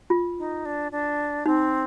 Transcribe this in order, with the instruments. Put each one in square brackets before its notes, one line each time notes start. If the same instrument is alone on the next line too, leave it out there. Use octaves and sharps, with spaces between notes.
[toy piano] F4
[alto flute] D#4
D4
D4
[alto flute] C4 [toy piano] D#4